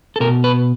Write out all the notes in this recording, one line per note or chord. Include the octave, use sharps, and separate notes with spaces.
A4
B2 A#4
B4